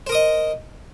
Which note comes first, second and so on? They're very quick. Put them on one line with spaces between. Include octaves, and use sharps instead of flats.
C5 A#4 D#6 D#5